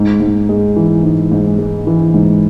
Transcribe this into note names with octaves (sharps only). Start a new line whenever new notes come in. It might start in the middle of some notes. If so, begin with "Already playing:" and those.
Already playing: G#2
G#2
G#3
E3
G#2
G#2
G#3
E3
G#2